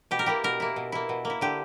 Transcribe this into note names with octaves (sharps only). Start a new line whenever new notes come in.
B2 G4
A#4
A#3 E4 G4
B2 A#4
A#3 E4
B2
A#3 E4
B2
A#3
E4
D3 G4